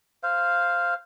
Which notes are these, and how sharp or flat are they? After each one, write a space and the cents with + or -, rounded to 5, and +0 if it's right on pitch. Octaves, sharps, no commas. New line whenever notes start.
C5 +0 F5 -5